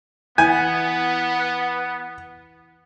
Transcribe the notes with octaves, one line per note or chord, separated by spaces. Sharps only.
E3 B3 F#5 G#5